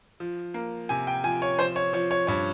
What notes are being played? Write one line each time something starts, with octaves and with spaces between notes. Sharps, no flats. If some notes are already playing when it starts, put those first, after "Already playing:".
F3
A#3
C3 G#5
G5
F3 G#5
C#5
F3 C5
C#5
F3 C#5
C#5
G2 C#5